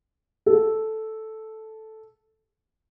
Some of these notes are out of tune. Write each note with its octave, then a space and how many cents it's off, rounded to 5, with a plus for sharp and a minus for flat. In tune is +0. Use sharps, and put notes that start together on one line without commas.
A4 -5